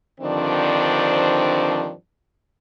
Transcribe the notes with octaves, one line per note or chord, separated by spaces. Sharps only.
G2 D3 D#3 F3 C4 D4